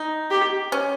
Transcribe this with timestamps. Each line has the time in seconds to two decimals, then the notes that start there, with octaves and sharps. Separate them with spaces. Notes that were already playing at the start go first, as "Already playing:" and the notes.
Already playing: D#4
0.31 G4
0.72 C#4